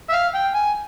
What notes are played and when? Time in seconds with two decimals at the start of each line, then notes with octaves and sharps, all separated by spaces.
0.09 E5
0.12 F5
0.34 G5
0.55 G#5